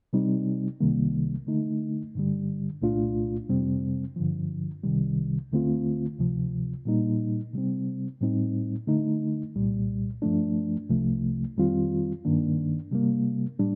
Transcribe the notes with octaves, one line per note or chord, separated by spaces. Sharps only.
C3 G3 C4 D#4
C2 C3 D#3 G3 A#3
D3 A3 D#4
G2 D3 G3
C2 A#2 A3 D4 F4
F2 C3 G3 C4
G2 D3 F3
C2 C3 D#3 G3
D2 D3 A3 C4 F4
D2 C3 F3
A#2 G3 A#3 D#4
C3 G3 C4
A2 G3 C4 D#4
D3 A3 D#4
C2 A#2 G3
G2 F3 A3 D4
C2 C3 F3 A3
F2 D#3 G3 C4 F4
G2 D#3 A#3 D4
C3 G3 A#3
A2 G3 D4